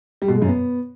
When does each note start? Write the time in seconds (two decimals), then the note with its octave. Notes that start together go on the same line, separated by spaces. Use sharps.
0.22 G3
0.28 B2
0.35 G#3
0.42 F#2
0.48 B3